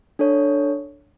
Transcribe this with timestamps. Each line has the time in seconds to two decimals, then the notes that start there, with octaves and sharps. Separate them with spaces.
0.19 D4 A4 C#5